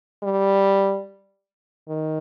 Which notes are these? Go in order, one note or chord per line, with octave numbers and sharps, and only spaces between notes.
G3
D#3